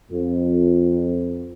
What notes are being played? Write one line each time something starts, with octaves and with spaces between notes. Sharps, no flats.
F2